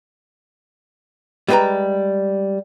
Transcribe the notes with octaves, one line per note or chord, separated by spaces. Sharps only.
G3 G#3 B3 B4 G5 A#5